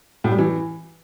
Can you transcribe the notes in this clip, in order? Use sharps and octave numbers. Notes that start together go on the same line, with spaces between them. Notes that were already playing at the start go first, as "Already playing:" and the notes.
A2
G3
E3